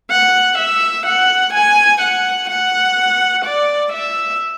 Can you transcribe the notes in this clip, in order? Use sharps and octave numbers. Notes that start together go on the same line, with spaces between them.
F#5
E5
F#5
G#5
F#5
F#5
D5
E5